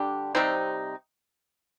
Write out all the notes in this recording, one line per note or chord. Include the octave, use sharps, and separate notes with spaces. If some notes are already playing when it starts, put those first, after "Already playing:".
Already playing: D3 G3 D4 G4
C3 G3 C4 D#4